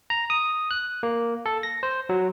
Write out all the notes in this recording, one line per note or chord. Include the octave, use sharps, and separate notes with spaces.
A#5
D#6
F#6
A#3
A4
A#6
C5
F#3